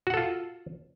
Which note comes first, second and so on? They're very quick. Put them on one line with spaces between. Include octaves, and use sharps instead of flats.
F#4 F#5 A4 F4